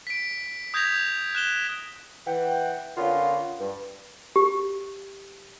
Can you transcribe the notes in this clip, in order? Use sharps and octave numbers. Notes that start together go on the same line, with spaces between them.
B6 D7
D#6 G6 G#6 A#6 B6 F7
F#6 E7 G7
E3 F#5 G5
D3 A#3 B3 C#4 F4
G2
G4